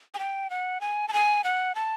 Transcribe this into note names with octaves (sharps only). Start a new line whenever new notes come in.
G#5
G5
F#5
G#5
A5
G#5
F#5
A5